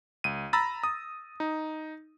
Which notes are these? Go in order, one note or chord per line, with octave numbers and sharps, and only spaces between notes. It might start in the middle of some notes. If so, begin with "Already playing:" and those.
C#2 D#7
A#5 B5 E6 A6 A#6
D#6
D#4